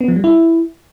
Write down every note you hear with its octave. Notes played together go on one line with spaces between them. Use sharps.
B3
F3
G3
E4